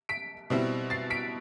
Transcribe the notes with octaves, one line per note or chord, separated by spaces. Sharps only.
B6 D7
B2 G3 C4 E4
A6 C7
B6 D7